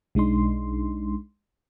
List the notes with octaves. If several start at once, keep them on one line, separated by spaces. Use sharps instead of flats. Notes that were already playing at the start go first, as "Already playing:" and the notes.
B1 G#3 D4 D#4 C6